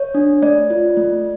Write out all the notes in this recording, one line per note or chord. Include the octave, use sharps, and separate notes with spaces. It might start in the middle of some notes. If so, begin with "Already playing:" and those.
Already playing: C#5
D4
A3 D5
F4
A3